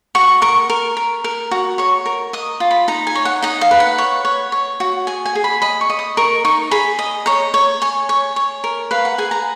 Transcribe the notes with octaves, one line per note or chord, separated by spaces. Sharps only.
F#4 C#6
A#4 C#6
A#4
A#4
A#4
F#4
C#5 C#6
A#4
D#5 D#6
F4
B5
D#4 A#5
G#5
C#5
F#5
D#4 D#5
F5
B4
F#5
C#5
C#5
C#5
F#4
G#4 G#5
G#5
G#4
B5
D#5 B5
C#6
D#5
D#6
A#4 C#6
D#4 C#6
G#4 B5
D#5
C#5 A#5
C#5
C#5 G#5
C#5
C#5
A#4
B4 F5
F#5
G#4 G#5
A#5